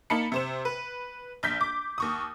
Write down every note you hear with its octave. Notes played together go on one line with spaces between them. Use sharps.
A#3 D#4 A5 B5 C#7
C3 C5 E7
B4
A#1 G6 B6
D6
D#2 C#6 D#6